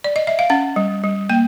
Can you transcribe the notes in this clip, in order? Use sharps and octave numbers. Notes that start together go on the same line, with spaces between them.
D5
D#5
E5
F5
C#4 F#5
G3
G3
A#3 G5